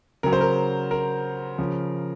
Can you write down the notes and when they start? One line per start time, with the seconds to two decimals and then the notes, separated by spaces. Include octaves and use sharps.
0.23 C#3 F#3 A#4
0.33 C5
0.41 A#4
0.91 A#4
1.58 C#3 F3